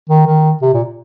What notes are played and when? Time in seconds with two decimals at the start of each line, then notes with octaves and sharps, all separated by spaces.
0.10 D#3
0.27 D#3
0.62 C3
0.74 A#2